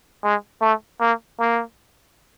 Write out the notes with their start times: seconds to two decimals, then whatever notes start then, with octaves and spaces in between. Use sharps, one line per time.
0.24 G#3
0.61 A3
1.01 A#3
1.39 A#3